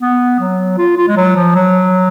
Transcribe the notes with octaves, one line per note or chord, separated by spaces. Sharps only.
B3
F#3
F4
F4
G#3
F#3
F3
F#3